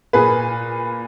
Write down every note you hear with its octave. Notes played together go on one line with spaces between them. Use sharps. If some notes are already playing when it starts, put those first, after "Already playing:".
A#2 G#4 B4